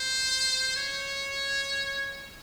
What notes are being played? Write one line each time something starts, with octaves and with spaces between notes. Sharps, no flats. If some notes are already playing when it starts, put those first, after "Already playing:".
Already playing: C5
C#5